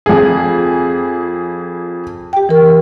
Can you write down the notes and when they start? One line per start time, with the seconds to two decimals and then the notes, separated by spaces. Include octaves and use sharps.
0.06 F2 G#4
2.33 G4 G5
2.49 E3 A#4